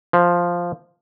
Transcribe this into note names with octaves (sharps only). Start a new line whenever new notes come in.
F3